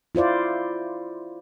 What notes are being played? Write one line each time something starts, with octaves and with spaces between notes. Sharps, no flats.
E4 F4 C5 D5